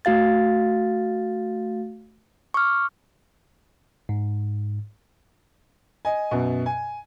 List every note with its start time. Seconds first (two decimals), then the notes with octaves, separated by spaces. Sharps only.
0.05 A3 F#4 F5 A6
2.54 C#6 D6 F6
4.09 G#2
6.05 D#5 G#5
6.31 F#2 B2
6.66 G#5